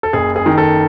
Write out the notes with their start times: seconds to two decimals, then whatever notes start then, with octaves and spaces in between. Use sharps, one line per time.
0.03 A4
0.13 F#1 G#4
0.36 G#4
0.46 D#3
0.58 A4